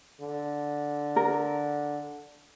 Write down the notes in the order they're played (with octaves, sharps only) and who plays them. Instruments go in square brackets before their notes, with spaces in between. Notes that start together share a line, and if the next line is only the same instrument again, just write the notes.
[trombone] D3
[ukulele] A#4